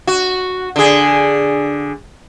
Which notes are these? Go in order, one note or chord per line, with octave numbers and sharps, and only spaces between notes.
F#4
D3 G#4